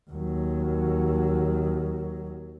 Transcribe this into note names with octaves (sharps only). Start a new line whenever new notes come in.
D#2 F#3